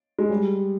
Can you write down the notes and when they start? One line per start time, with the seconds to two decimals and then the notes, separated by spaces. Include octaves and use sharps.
0.19 G#3
0.30 G3